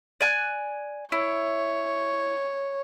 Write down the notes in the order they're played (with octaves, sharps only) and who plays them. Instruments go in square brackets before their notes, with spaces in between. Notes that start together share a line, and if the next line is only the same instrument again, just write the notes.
[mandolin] D5 G#5 F#6
[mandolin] E4 [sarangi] C#5